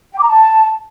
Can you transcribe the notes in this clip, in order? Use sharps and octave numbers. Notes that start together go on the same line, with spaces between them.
G5
D6
A#5
A5